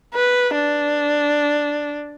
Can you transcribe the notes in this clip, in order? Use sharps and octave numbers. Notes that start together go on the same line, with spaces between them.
B4
D4